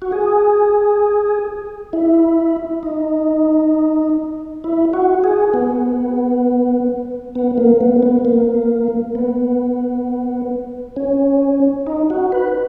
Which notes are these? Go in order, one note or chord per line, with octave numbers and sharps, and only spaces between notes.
F#4
G#4
E4
D#4
E4
F#4
G#4
B3
B3
A#3
B3
B3
A#3
B3
C#4
D#4
F#4
B4